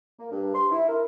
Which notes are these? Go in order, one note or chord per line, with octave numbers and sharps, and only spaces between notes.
A#3
G2
C6
E4
A#4